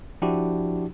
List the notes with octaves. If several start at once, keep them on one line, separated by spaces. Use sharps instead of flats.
F3 D4 E4 F#4 G4